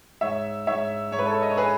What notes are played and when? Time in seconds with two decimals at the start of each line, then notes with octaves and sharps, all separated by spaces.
0.21 G#2 C#5 E5
0.67 G#2 C#5 E5
1.12 G#2 C#5
1.19 B4
1.26 A4 C#5
1.42 D#5
1.50 C#5
1.57 G#4 B4